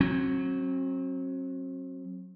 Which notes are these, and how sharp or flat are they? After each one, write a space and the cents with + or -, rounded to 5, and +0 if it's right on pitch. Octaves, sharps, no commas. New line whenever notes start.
F#3 +0 C4 +40